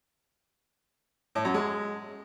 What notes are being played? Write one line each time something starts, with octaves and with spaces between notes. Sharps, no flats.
A2
F#2
G#3